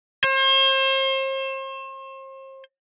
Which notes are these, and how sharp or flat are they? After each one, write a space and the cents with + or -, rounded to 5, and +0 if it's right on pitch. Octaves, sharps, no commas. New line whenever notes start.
C5 +40